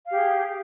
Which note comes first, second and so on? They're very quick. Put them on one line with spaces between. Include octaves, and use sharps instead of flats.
F5 G4 G#4